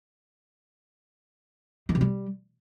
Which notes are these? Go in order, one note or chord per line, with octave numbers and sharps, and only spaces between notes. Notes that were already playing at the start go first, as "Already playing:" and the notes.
D#3
C3
G3